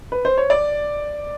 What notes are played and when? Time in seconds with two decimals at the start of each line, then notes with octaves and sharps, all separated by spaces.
0.12 B4
0.25 C5
0.38 C#5
0.50 D5